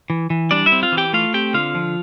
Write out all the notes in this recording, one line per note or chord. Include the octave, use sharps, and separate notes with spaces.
E3
E3
G3 D4 D5
E4 E5
C4
F4 F5
E3
G4 G5
A3 F4 F5
C4 G4 G5
D3 F4 F5
F3